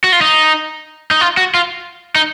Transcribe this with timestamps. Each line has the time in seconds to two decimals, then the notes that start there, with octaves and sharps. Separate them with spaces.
0.04 F#4
0.12 F4
0.21 D#4
1.11 D#4
1.21 F4
1.37 F#4
1.55 F4
2.16 D#4